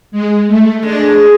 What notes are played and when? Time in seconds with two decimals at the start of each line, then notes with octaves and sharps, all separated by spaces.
0.12 G#3
0.47 A3
0.83 G#3 D4